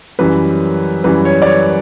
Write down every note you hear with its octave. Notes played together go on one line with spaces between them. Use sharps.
F#2 E3 G3 B4
F#2 E3 G3 B4
C#5
D5
C#5